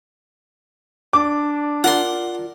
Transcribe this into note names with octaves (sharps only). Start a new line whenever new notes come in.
D4 D6
F4 A#4 D5 F#5 C6